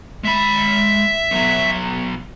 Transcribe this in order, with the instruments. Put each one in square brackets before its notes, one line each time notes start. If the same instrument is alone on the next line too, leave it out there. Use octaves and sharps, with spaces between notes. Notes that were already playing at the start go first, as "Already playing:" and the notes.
[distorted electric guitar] G#3 B5 [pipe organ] E5
[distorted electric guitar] B1 F#3